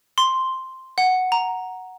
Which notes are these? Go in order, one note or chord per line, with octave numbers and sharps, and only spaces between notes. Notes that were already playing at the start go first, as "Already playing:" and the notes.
C6
F#5
A#5